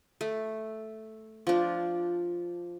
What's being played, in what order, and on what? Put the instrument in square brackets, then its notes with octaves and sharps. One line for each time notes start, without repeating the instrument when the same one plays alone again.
[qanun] A3
F3 D4